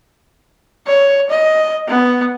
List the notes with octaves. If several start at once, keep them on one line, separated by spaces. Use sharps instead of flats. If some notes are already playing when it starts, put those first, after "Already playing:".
C#5
D#5
B3